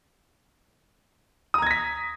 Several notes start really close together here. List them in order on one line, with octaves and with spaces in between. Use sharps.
D#6 A#5 G#6 A#6 B6